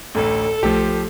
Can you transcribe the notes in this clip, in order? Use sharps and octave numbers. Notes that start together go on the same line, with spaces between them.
A1 D2 A4
B1 F3 A3 G4